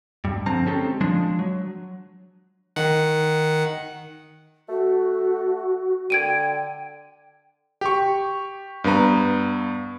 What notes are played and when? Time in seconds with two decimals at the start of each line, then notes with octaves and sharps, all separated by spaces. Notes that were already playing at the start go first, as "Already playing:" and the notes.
0.25 G2
0.46 D3 F3 C4 A5 A#5
0.66 G#3 C4 C#4 D#4 G4 A4
1.01 F3 G#3 D4
1.39 F#3
2.76 D#3 F#5
4.69 A3 F#4
6.10 D3 G5 G#6 D7 D#7
7.81 G4 C#6
8.84 G2 B3 B4 A#5